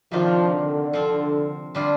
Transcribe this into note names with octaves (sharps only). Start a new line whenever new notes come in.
C3 D#3 F3 A#3 D4 F4
D3
F3 C4 F4
D3 G3 D4 F4